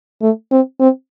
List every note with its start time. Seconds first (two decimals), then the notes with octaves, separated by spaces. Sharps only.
0.22 A3
0.51 C4
0.80 C4